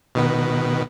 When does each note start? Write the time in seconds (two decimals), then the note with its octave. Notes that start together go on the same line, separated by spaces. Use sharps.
0.15 B2 D#3 B3